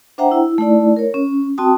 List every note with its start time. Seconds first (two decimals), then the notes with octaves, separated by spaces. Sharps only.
0.18 D4 C5 E5 F#5 G5 A#5
0.31 E4
0.58 A3 D#4 E4 D5
0.96 A#4 C#5
1.14 C#4
1.58 C4 F#4 G5 A5 D#6